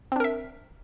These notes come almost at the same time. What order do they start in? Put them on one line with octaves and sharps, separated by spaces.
C4 D4 A#4 E5